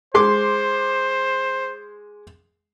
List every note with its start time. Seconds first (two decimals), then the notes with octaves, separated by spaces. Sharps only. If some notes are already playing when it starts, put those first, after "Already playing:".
0.14 G#3 C5 C6 D6